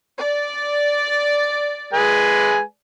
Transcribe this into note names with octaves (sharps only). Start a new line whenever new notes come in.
D5
G#3 B4 G#5